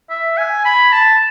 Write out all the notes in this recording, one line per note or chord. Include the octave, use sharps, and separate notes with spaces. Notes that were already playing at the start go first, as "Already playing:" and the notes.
E5
G#5
B5
A5